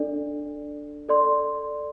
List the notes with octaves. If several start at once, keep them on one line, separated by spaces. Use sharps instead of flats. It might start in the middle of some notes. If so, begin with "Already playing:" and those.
Already playing: D4 A4 D5
A4 D5 C6